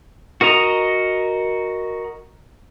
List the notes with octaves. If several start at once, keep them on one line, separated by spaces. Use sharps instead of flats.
F#4 A#4 D#5 A#5